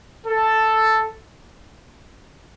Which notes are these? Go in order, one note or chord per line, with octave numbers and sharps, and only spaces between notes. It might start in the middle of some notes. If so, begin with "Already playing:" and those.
A4